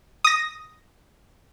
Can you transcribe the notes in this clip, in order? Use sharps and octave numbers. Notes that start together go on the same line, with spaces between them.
D#6 A#6